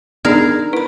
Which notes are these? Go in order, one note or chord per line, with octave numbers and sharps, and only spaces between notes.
B3 D4 D#4 G#4 A#4 D5 G#6
E4 B4 B5